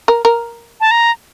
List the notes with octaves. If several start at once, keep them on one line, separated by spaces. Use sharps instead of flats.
A#4
A#4
A5
A#5